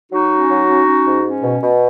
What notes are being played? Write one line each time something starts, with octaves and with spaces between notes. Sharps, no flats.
F#3 D#4 F#4
C#4
F#3
C#4
C#4
G#2
C#4
B2
B2